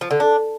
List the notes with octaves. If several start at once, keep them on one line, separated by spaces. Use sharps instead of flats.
F3
D3
D4